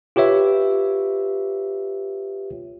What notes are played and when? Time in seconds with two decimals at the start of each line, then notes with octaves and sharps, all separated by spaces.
0.16 F4 G4 B4 C#5 E5